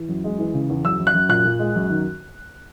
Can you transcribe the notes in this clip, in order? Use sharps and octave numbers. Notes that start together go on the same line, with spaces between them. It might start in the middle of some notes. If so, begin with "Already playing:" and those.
Already playing: E3
F#2
G#3
E3
C#3
E2
F#2 E6
F#2
F#6
F#2
A#2 F#6
A#2
G#3
F#2
D#3